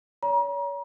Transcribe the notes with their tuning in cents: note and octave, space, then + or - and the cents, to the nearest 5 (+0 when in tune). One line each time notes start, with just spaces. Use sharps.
C#5 +35 A#5 +35